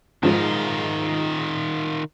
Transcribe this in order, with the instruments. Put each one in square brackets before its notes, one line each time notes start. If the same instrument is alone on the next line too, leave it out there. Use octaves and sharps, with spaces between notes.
[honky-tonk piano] G#2 F3 [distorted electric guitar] D#3 F4